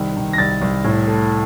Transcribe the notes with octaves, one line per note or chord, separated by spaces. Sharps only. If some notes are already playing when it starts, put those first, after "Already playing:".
Already playing: C2 D#3
D#3
A#6
C2 A6
C2
A2
A3